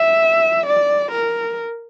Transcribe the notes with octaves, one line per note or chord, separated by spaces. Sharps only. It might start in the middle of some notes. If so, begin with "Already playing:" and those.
Already playing: E5
D5
A#4